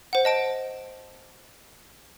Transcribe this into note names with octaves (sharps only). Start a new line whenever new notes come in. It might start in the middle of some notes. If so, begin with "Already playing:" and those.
C5 F#5
D#5 A5 D7